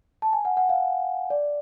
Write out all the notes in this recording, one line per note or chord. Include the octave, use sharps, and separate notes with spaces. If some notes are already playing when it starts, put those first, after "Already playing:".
A5
G#5
F#5
F#5
F5
D5